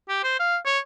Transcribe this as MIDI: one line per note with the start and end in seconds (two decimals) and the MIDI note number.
0.09 0.18 67
0.24 0.39 72
0.40 0.57 77
0.66 0.79 73